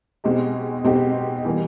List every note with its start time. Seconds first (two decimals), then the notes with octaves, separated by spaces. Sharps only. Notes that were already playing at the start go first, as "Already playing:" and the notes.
0.24 B2 G#3 C4 D#4 G4
0.84 B2 G#3 C4 D#4 G4
1.45 E3 G3 A#3